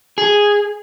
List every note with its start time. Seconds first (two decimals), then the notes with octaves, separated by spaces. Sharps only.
0.18 G#4